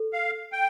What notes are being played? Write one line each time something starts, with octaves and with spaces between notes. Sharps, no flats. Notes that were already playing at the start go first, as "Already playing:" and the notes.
Already playing: A4
F5
G5